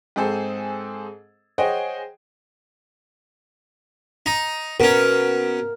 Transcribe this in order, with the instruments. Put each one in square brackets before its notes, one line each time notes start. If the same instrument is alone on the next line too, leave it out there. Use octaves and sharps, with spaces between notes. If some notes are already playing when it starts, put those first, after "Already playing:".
[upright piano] G#2 C4 G#4 A4 C5
G#4 C5 C#5 D#5 F#5 G5
[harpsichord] D#4
[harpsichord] B2 C#4 [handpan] A#4